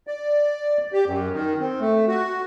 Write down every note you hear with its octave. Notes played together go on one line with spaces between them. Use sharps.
D5
G4
F#2
D#3
C4
A3
F#4